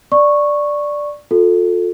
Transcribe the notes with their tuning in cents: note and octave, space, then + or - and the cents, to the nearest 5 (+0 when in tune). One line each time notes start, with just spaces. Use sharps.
D5 +0 C#6 -5
F4 +35 A4 +0